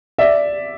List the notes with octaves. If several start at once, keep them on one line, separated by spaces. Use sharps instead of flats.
D5 E5